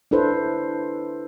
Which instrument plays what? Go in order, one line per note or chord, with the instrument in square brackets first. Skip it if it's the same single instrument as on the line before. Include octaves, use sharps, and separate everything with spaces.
[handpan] D4 E4 A4 B4 C5